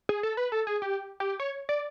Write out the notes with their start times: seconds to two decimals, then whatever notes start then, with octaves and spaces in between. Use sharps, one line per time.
0.09 G#4
0.23 A4
0.37 B4
0.52 A4
0.67 G#4
0.82 G4
1.20 G4
1.40 C#5
1.69 D5